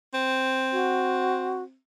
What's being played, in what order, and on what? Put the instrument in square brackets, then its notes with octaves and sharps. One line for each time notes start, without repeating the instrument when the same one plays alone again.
[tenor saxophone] C4
[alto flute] F#4